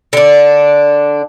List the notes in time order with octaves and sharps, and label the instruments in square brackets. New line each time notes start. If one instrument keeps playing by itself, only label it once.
[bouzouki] D3 D4